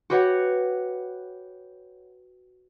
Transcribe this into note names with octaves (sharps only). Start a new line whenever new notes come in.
F#4 G4 B4 C#5 F#5